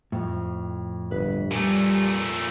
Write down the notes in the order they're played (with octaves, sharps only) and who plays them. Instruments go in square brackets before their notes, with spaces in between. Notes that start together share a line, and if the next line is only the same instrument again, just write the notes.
[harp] F2 [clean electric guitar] A2
[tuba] G1 [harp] B4
[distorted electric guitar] A#2 A3 [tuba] G3 [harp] C#5 G#5 A5